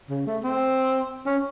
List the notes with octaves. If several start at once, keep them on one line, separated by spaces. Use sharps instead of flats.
C#3
A3
C4
C#4